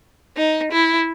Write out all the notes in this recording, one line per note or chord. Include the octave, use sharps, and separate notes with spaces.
D#4
E4